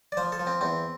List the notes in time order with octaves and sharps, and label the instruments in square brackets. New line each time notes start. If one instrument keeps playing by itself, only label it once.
[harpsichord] D5
F3 C5
A4
F3
C4
E2 C4